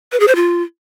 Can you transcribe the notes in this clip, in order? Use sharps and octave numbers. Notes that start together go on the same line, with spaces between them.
B4
G#4
C5
F4